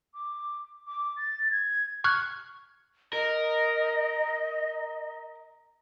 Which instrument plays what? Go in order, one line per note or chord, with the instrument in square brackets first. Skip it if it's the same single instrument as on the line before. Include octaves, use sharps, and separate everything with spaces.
[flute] D6
D6
A6
G#6
[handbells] C#6 F6 F#6 G#6
[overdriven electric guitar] A#4 [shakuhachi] D#5